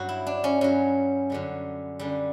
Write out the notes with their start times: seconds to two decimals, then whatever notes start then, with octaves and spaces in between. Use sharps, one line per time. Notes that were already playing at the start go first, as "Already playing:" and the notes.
Already playing: G2 F#3 F#4
0.09 E4
0.27 D4
0.44 C#4
0.61 G2 F#3 C#4
1.30 F#2 D3 G3
2.00 F#2 D3 G3